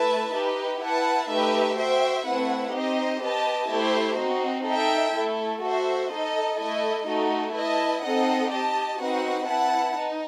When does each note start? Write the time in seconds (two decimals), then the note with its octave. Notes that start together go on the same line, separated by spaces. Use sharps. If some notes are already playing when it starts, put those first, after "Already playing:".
Already playing: A3 E4 B4 E5 A5
0.33 D#4 G4 B4
0.82 E4 B4 F#5 A5
1.29 A3 D#4 G4 B4 E5
1.78 F#4 C5 E5 G5
2.26 A3 C4 E4 B4 F#5
2.73 C4 D#4 G4 C5 D#5
3.22 G4 B4 D#5 A5
3.70 A3 E4 G4 C5
4.18 C4 D#4 F#4
4.67 D#4 A4 E5 G5
5.15 A3 E4 A4
5.63 F#4 A4 C5 E5
6.11 D#4 A4 D#5
6.60 A3 E4 A4 D#5
7.07 A3 D#4 F#4
7.56 E4 B4 D#5 A5
8.04 C4 D#4 A4 D#5 F#5
8.51 G4 D#5 A5
9.00 C4 D#4 F#4 B4 F#5
9.47 E4 B4 F#5 A5
9.96 D#4